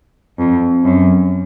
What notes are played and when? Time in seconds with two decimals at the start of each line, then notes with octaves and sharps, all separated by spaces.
0.38 F2
0.84 F#2